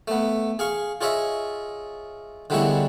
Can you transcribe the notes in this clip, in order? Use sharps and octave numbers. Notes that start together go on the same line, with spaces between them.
A3 B3
G#4 F5 C#6
F4 G#4 C#5 D#5 E5
D3 G3 G#3 B3 E4 C#5